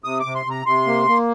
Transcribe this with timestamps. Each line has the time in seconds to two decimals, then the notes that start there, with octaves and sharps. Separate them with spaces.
0.04 C3 D#6
0.20 D6
0.25 C3
0.35 C6
0.46 C3 A#5
0.66 C3 C6
0.87 A#3
1.07 A#3